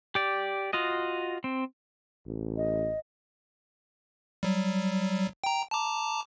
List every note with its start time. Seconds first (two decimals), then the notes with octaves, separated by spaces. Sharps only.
0.15 G4 D5
0.73 F4 F#4 D#5
1.44 C4
2.27 A1
2.57 D#5
4.43 F#3 G3
5.44 G5 A#5
5.71 A5 A#5 D6